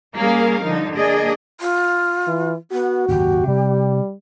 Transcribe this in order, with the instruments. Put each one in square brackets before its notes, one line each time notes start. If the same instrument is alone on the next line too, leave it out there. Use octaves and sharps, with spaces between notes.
[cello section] G3 A#3 C#4 G#4 A#4 F5
D3 F3 G3 D#4
A#3 D4 G#4 D5 D#5
[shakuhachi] F4
[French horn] E3
[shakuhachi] B3 [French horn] F#4
[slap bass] F#1 D#2 G#2 [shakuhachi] G4
[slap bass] C3 C4 [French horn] G3